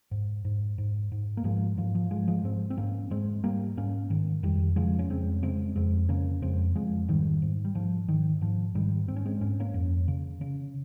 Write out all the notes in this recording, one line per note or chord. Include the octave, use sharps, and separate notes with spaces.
G#2
G#2
G#2
G#2
A#3
G#2 F3 G#3
G#2 F3
F3
G#2 F3 G#3
F3 G#3
G#2 G#3 C4
C4
G#2 A#3 C#4
G#2 G#3 C4
G#2 G3 A#3
G#2 A#3 C#4
G#2 D#3
F2 D#3 G3
C#3 F3 G#3
C#4
F2 G#3 C4
C#3 G#3 C4
F2 G#3 C4
C#3 A#3 C#4
F2 G#3 C4
F2 F3 G#3
G#2 D#3 G3
G#2
G3
G#2 F3
G#2 D#3
G#2 F3
G#2 D#3 G3
G#2 C4
C#4
G#3 C4
G#2 C#4
A#3 C#4
F2
C#3
C#3